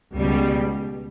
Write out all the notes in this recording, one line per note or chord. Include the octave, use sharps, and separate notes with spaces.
C#2 B2 G3